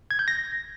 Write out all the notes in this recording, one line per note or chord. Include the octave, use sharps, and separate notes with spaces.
G#6
G6
A#6